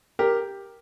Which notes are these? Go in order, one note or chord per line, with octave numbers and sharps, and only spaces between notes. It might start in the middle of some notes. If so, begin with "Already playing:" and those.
G4 A#4